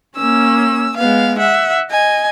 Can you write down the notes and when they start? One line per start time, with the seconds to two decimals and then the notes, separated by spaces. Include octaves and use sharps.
0.17 A#3 C#4 E6
0.97 G#3 B3 F5
1.39 E5 F#5
1.91 D#5 G#5